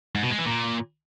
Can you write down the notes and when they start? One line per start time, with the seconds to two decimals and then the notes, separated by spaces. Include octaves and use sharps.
0.15 G#2
0.23 B2
0.31 G#3
0.38 E3
0.46 A#2